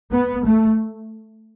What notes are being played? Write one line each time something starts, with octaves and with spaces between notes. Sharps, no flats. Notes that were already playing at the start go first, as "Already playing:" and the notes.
B3
A3